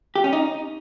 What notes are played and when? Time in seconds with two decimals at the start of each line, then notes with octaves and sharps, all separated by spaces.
0.16 G4
0.24 C#4
0.33 D#4